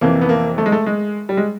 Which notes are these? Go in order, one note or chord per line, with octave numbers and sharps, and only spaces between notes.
F2 C3 E3 A#3
B3
A#3
A3
G#3
A3
G#3
G3
G#3